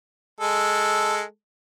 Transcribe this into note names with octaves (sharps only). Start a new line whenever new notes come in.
G#3 A4